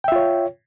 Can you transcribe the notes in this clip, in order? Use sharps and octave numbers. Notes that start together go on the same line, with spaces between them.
F4 C#5 E5 G5